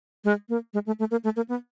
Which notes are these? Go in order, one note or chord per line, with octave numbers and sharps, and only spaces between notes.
G#3
A#3
G#3
A3
A3
A#3
A3
A#3
B3